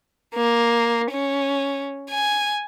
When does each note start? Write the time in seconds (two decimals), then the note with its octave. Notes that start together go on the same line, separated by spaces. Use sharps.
0.35 A#3
1.12 C#4
2.11 G#5